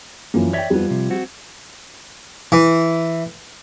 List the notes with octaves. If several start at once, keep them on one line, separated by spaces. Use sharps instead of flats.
F#2 E3 F3 A#3
C#5 D5 E5 G5 G#6
F2 F3 G3 B3
C3
C4 F#4
E3